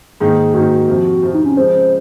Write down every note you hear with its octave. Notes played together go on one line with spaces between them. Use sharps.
G#2 D#3 A#3 D#4 G#4
G#2 D#3 A#3 D#4 F#4
F2 C3 F3
F2 C3 F3
D#4
C#4
C#3 F3 G#3 C5